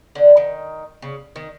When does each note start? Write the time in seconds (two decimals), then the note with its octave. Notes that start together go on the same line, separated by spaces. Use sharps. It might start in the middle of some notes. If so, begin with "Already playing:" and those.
0.15 D3
0.37 D#3
1.02 C#3
1.36 D#3